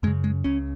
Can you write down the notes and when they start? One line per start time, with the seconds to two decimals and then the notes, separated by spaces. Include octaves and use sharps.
0.03 F#2 G#3
0.07 C#3
0.24 G#3
0.44 C#2 C#3 C#4